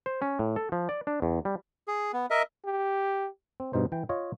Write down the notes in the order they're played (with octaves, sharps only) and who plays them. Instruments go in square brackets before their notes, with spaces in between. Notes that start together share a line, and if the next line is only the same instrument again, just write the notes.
[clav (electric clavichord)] C5
C#4
A2
A4
F3
D5
D4
E2
G3
[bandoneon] G#4
B3
A#4 D#5 E5
[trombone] G4
[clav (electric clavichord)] C4
G2 B2 D#4 C5
E3 G5
F4 C#5 D#5